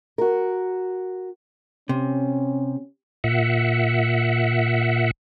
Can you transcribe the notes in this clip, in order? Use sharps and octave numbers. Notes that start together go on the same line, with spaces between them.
F#4 A#4
C3 C#4
A#2 E5 F#5